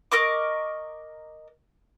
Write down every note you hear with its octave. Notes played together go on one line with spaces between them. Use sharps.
A#4 D#5 C#6 D6